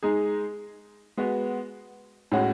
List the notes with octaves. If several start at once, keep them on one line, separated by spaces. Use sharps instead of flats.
G#3 D#4 G#4
G#3 B3 F#4
A2 G#3 C#4 F#4